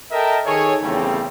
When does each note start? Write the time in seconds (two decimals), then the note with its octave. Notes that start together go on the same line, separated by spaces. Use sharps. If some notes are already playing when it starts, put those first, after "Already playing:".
0.11 A4 A#4 D#5 E5 G5 A5
0.45 D#3 G#4 A4 C#5
0.82 E2 C#3 G3 A3 C4 C#4